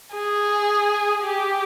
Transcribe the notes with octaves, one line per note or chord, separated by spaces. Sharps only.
G#4
G4